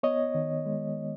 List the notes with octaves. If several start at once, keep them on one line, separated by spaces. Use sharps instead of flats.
B3 C#5 D#5
D#3
G#3